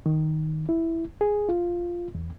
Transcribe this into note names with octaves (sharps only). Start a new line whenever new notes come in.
D#3
E4
G#4
F4
E2